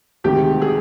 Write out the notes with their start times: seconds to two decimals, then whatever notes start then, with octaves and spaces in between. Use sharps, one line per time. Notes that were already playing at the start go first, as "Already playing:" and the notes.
0.24 D2 C3 D#3 G#3 G4
0.62 G#4